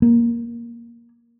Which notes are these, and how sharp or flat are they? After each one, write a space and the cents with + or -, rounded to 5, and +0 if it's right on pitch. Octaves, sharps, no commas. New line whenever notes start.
A#3 +10